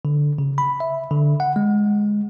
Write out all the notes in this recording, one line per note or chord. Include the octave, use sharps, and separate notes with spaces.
D3
C#3
B5
E5
D3
F#5
G#3